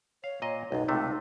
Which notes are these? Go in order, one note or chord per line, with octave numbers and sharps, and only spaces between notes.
C#5 F5
A#2 D#5
B1 F#2 D#4
C#2 C3 A3